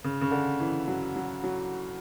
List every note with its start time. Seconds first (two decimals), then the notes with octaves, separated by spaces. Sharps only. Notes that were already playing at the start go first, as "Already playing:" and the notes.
0.04 C#3
0.21 C#3
0.31 D3
0.60 E3
0.88 F#3
1.16 F#3
1.43 F#3